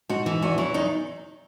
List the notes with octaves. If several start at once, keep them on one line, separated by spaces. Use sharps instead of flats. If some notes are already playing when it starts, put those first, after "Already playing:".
G#2 F#4
E3
E2 F#4
F#3 E4
E2 D#4